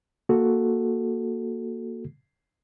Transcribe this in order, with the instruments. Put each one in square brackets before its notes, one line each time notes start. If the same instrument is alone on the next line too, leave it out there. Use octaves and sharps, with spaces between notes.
[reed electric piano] A#3 F#4 A4